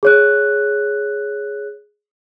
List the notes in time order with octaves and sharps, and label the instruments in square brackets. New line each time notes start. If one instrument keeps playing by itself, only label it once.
[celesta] G#4 C#5 F#6